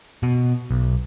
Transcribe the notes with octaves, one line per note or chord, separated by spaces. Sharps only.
B2
B1